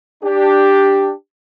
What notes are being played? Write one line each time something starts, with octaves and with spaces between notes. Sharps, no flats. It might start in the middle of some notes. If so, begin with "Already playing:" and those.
D4 G4